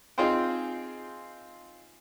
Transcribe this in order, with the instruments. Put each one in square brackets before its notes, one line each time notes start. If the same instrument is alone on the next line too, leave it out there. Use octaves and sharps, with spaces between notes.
[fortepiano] C4 D#4 F4 G#4 C5 G5